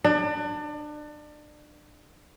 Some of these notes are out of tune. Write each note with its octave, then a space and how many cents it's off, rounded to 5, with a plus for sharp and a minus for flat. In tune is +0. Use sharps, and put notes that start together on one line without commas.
D4 +30